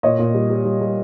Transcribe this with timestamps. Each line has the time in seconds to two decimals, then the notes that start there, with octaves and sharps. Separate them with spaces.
0.03 A#2 C#5 D#5
0.19 A#2
0.34 G3
0.50 G3
0.65 G3
0.81 G3